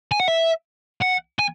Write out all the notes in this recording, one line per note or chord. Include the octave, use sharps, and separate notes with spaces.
G#5
F#5
E5
F#5
G#5